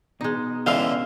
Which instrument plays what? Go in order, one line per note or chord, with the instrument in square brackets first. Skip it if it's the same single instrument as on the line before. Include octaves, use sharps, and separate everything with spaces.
[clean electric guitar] B2 [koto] G#3 D#4
[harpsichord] C#2 D3 E3 [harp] F5 E6